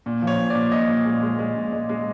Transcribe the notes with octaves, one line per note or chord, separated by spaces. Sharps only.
A#2
F3
C#5
A#2
A#2 D5
A#2 D#5
A#2
G#3
G#3
G#3
A#2
G#3
G#3